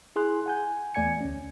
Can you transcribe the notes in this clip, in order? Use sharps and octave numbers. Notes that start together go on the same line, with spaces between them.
E4 G#4 C6 F#6
F#5 G#5 G6
E2 A3 D5 G#5 G#6 C#7
D2 C#4